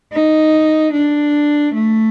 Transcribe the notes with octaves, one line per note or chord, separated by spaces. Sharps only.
D#4
D4
A3